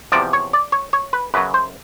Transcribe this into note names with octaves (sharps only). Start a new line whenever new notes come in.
E2 C3 F3 D5
C#5
D5
C#5
C#5
B4
F#2 C#3 F#3 B4
C5